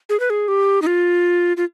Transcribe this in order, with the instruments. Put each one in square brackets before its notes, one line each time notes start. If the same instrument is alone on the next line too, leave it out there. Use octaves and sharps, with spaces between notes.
[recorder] G#4
B4
G#4
G4
D#4
F4
F4